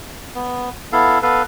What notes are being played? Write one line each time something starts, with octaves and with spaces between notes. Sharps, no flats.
B3
B3 E4 A4 F5
B3 A4 B4 F5